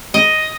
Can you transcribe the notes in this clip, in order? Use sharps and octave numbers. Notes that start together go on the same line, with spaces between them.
D#5